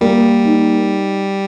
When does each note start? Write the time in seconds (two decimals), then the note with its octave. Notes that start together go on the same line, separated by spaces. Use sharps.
0.01 G3 A#3
0.45 D#4